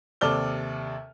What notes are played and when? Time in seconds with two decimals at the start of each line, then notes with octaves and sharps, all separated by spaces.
0.21 D#2 C3 A4 D5 F6 G7